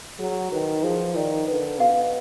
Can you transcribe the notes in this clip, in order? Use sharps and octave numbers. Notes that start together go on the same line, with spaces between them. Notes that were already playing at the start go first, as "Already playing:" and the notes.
F#3 G#4
D#3 B4
F3 G#4
D#3 D5
D3 B4
B2 F5